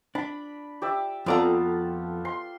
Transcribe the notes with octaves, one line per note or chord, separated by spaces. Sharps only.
D4 B5
G4 D5 E5
F2 B3 F4 A4 D5 A#5
C6